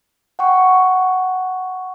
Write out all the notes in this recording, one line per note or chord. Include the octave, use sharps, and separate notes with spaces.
F#5 G5 C#6